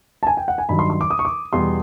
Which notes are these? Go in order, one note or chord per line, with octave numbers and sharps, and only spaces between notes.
A5
G#5
G5
F#5
G#5
G2 D#3 F#3 B5
C6
C6
D6
D#6
C#6
D6
E2 B2 G3 C6